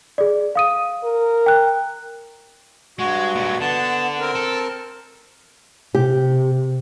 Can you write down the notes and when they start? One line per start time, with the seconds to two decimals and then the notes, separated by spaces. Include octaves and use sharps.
0.18 G#4 D5
0.55 F5 D#6 D#7
1.04 A#4
1.46 G5 F#6
2.99 G2 G#3 F#4
3.35 A#2 G#3
3.60 D3 B3 A5
4.20 C4 A#4
4.35 A4
5.95 C3 G4